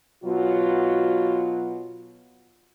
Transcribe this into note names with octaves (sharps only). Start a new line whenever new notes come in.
B2 F#3 F4